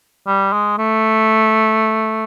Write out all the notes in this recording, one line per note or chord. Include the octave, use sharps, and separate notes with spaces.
G3
G#3
A3